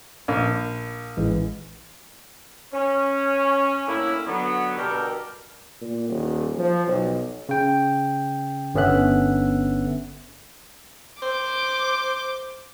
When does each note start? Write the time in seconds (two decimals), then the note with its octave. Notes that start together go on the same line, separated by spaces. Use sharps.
0.28 A#1
1.17 A1 E3 G#3
2.73 C#4
3.87 A2 A#3 C#4 D4 E4
4.27 D3 F#3 B3
4.78 B2 D3 G3 G4 A4 A#4
5.81 A#2
6.09 D#1
6.58 F3
6.87 B1
7.49 C#3 G5
8.74 G1 D3 B3 C#4 E5 F#6
11.23 C5 D6